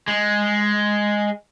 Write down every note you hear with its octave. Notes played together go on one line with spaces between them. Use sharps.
G#3